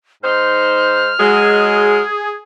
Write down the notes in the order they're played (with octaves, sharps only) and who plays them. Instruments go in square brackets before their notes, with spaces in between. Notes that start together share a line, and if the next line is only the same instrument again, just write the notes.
[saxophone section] G#2 D#4 C5 [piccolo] F6
[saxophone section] F#3 G#3 [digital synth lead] G#4